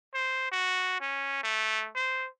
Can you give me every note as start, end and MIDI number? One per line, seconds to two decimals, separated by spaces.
0.14 0.47 72
0.51 0.97 66
1.01 1.40 61
1.43 1.89 57
1.95 2.28 72